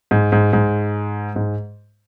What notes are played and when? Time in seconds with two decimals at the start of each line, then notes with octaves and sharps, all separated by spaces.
0.11 G#2
0.32 G#2
0.53 G#2
1.36 G#2